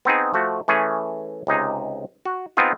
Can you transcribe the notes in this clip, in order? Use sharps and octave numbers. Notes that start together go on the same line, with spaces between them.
B3 C4 D#4 G#4
F3 A3 F#4
E3 A3 C#4 G#4
C#2 C3 D#4 G#4
F#4
B3 C4 D#4 F4 G#4